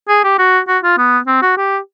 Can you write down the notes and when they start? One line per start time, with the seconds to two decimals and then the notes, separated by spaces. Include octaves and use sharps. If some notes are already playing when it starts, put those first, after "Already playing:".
0.08 G#4
0.24 G4
0.38 F#4
0.68 F#4
0.83 F4
0.98 B3
1.27 C4
1.42 F#4
1.57 G4